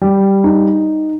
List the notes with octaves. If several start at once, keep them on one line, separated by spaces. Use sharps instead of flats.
G3
D#4